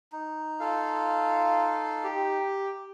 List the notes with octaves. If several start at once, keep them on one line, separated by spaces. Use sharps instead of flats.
D#4
F4 A4 F5
G4